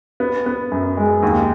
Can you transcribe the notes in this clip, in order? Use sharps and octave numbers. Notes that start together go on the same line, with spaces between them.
B3
B3
F#2
G#3
D#2